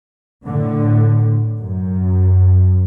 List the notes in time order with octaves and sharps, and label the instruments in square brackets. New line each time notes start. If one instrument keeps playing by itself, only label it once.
[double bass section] A2 D3
F#2